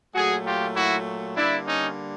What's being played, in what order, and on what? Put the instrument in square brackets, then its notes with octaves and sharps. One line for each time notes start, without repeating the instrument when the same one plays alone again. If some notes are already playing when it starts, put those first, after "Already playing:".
[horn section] A#2 F#3 A3 F#4 G#4
F4 G4
E4 F#4
D3 G3 A#3 D4 E4
C#4 D#4